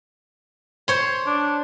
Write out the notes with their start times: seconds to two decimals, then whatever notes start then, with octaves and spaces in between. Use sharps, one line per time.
0.88 C5 C#5 C6
1.27 D4